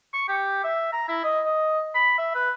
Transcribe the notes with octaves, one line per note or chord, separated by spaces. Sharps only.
C#6
G4
E5
A#5
E4
D#5
D#5
B5
E5
B4